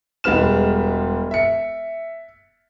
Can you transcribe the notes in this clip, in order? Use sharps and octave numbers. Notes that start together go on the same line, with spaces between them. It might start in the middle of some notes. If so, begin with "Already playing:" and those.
E1 G3 G#3 B4 F6 E7
E5 C#7